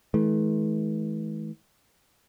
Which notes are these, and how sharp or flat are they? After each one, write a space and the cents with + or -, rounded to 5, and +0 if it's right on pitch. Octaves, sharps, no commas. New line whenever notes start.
E3 -35 A3 -45